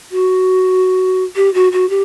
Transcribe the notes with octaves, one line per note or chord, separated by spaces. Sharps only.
F#4
G4
F#4
F#4
G4